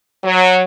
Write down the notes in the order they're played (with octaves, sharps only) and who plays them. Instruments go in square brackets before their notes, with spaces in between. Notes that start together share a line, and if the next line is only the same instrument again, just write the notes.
[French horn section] F#3